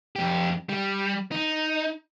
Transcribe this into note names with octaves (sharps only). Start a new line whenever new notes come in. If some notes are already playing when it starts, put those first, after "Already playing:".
F2 G4
G3
D#4